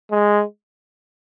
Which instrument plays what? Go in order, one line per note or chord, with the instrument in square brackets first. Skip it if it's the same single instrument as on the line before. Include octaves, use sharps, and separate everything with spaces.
[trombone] G#3